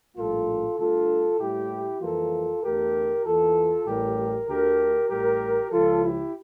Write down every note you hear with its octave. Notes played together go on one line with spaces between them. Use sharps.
A#1 A2 G3 A#3 F4 A4
G2 D3 A3 F4 A4
A2 G3 A#3 E4 G4
F2 E3 G3 A#3 F4 A4
E2 D3 A3 G4 A#4
E2 E3 A#3 F4 A4
A1 A2 E3 G3 G4 A#4
D2 D3 A3 G4 A#4
A1 A2 G3 G4 A#4
C#2 C#3 F3 F4 A4
E4 G4